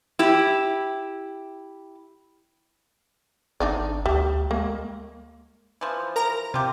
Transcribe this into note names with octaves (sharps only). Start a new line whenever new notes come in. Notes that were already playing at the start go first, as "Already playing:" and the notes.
E4 G4
G#1 D4 D#4 D5
D2 G3
G#3 A#3
E3 F3
A#4 A#5
C3 F4 G4